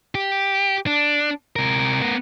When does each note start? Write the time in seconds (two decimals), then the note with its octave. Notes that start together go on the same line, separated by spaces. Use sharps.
0.15 G4
0.86 D4
1.56 C3 A#4
2.02 B3 A#4